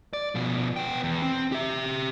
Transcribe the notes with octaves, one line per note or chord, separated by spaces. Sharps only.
D5
B2 F3
B3 G5
E2
C4
G4 E5